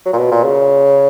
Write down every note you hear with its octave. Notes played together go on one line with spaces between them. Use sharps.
F#3
A#2
B2
A#2
C#3